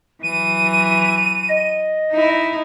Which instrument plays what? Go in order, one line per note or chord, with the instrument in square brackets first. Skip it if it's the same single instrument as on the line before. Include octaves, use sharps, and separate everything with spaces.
[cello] E3 F#3 [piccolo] D#7
[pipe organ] D#5
[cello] D#4 E4